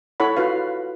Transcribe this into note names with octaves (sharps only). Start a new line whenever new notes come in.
E4 A4 C#5 F#5 B5
F4 F#4 B4 F5